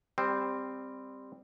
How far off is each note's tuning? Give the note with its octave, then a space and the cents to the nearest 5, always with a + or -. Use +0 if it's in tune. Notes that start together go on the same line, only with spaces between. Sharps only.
G3 +15 C4 +0